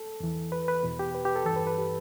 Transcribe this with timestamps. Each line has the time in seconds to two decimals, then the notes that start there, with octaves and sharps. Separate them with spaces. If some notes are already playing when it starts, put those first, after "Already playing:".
Already playing: A4
0.20 E2 E3
0.52 B4
0.68 B4
0.83 E2 B2
0.99 G4
1.15 B4
1.25 G4
1.36 A4
1.46 G2 E3 A4
1.56 B4
1.67 B4
1.78 G4